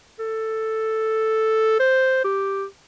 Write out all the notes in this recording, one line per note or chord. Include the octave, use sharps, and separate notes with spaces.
A4
C5
G4